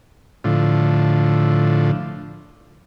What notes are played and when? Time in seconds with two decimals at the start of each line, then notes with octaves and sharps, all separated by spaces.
0.44 A2 D3 F3